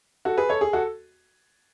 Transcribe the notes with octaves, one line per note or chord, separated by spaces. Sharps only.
F#4 A4
G#4 B4
A4 C#5
G#4
F#4 A4